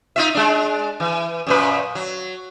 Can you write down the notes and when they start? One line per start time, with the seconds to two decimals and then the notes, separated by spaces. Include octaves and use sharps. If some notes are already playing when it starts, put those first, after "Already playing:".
0.16 D#4 F4 E5
0.35 G#3 D4
1.00 E3
1.47 F#2 A#2 B4
1.95 F#3